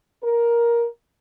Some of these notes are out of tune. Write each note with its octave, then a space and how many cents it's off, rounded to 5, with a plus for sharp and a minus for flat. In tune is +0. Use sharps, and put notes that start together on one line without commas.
A#4 +10